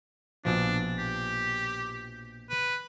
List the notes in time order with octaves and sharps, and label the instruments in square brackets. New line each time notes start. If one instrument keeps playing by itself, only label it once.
[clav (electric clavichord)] A#1 B2 F3 [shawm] D4
[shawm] G4
B4